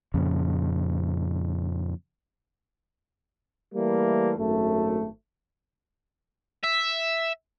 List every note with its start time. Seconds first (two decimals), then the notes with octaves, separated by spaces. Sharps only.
0.14 F2 A#2 C#3
3.75 E3 G3 A3 A#3
4.38 G#1 F#2 A3
6.64 E5